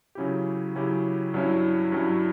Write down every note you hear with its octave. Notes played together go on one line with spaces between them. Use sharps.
C#3 F#3 C#4 E4 G4
C#3 F#3 C#4 E4 G4
G2 F#3 C#4 E4
G2 F#3 C#4 E4